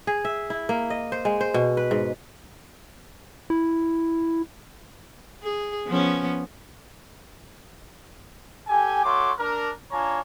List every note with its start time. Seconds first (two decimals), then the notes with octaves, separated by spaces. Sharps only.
0.07 G#4
0.25 E5
0.50 E4
0.69 A#3
0.90 D#5
1.12 C5
1.25 G#3
1.41 C5
1.54 B2
1.77 B4
1.91 G#2
3.50 E4
5.43 G#4
5.87 F3 B3 C#4
8.68 G4 A4 G#5
9.03 A3 F#4 C#5 C6 D6
9.38 D4 A#4
9.90 D4 F4 C#5 G#5 A#5